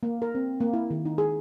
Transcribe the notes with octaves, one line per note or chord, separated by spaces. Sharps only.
A#3
A#4
C4
A#3
E4
D#3
D#4
G#4